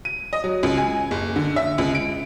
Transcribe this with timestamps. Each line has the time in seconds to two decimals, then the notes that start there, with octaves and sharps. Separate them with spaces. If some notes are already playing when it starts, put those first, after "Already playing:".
0.05 D#7
0.33 D#5
0.44 F#3
0.63 C#2
0.78 G#5
1.11 F#1
1.36 D3
1.56 E5
1.78 C#2
1.95 D7